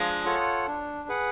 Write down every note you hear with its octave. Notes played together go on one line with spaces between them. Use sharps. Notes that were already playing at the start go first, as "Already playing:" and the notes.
Already playing: F3 G#3 D4
F4 A4 C#5 F#5
D4
G#4 B4 F#5